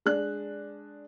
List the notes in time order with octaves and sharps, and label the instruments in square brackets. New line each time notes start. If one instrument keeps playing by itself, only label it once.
[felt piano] G#3 D4 F#6